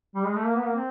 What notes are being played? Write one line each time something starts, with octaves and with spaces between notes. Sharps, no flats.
G3
G#3
A3
A#3
B3
A#3
C4